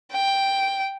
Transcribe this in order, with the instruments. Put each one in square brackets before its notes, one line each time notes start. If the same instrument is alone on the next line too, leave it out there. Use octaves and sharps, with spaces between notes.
[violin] G5